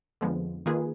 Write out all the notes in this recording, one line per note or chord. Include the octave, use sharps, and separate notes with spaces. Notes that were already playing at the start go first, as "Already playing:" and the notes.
F2 D3 F3 G#3 B3
D#3 A#3 F4 G#4 B4